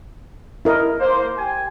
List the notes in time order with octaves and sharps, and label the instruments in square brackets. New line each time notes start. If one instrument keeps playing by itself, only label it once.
[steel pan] E4 A#4 D#5
[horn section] A#3 C5
G4 G5 G#5